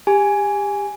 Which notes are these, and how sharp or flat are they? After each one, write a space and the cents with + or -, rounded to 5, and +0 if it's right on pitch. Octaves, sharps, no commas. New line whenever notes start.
G4 +25 G#5 +0